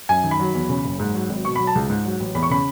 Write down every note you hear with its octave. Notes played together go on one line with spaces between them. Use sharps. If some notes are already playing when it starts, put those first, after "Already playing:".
F#2 G#5
D#3
B5
F#3
E2
C#3
F#1
G#2
F#3
G#1
B2 C#6
F#3 B5
A5
C#2
G#2
F#3
A1
E2 B5
C#6
C#3 B5